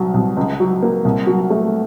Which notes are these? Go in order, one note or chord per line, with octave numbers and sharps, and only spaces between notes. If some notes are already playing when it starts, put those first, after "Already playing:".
Already playing: C2 F#3
C2
C#2
F#3
A#3
C2
F#3
A3